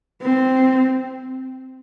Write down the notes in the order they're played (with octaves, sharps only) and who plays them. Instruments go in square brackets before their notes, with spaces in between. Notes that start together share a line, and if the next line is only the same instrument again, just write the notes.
[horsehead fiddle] C4